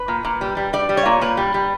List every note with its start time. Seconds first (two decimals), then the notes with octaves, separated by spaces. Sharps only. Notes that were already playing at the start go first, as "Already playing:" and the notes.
Already playing: B4
0.08 A#2
0.25 A#2
0.41 G3
0.57 G3
0.73 G3 D5
0.89 G3
0.97 C#5
1.06 A#2
1.21 A#2 B4
1.37 G3
1.54 G3